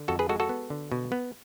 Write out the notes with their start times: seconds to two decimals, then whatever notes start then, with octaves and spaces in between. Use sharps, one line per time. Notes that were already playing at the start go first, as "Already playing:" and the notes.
Already playing: D3
0.08 F2 F#4 A4
0.19 G#4 B4
0.29 G#3 F#4 A4
0.40 F#4 A4
0.49 B3
0.70 D3
0.92 B2
1.12 B3